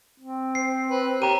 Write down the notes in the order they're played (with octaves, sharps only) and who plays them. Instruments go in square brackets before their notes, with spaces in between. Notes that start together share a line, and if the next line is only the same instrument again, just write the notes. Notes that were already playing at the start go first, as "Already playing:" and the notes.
[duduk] C4
[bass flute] C5 [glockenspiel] C7
[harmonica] B4
[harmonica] G4 A#4 [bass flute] C#5 [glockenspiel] A#5 D#7